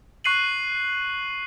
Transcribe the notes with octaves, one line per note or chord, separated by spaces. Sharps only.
C#6 F#6 C7 D#7 F#7